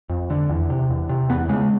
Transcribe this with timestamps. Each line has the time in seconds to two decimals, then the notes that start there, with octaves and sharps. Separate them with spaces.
0.10 F2
0.30 D3
0.50 E2
0.70 C3
0.90 E2
1.10 C3
1.29 E2 B3
1.48 C#3 G#3